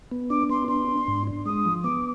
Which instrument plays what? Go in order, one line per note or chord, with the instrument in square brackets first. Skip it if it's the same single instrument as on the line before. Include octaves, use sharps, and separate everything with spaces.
[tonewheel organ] B3
[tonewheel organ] D4 [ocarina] D6
[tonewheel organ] B3 [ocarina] C6
[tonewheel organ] D4 [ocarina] C6
[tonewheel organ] D4
G#2
D4
[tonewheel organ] G#3 [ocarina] D#6
[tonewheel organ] F3
[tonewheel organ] B3 [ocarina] D6